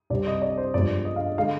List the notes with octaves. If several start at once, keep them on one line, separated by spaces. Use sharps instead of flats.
C2 C3 G3 C4 D5
D#5
D5
C5
G2 F3 G#3 B3 D5
D#5
F5
D#5
D3 G#3 F5